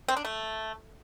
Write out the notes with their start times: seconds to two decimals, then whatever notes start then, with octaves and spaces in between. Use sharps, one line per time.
0.08 C4
0.17 D4
0.25 A3